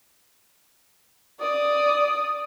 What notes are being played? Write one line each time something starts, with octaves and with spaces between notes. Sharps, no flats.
D5 D#6